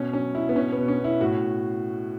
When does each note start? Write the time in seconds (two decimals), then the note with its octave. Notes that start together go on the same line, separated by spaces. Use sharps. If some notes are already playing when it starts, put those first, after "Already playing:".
Already playing: B2 C#4
0.13 F#3 C#4
0.34 B2 E4
0.49 B3
0.56 B2 C#4
0.72 B3
0.77 B2
0.88 C#4
0.99 B2
1.04 E4
1.20 A2 F#4